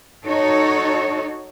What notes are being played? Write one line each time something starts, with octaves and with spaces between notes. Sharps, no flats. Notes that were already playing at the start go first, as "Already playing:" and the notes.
D#4 F#4 A4 C#5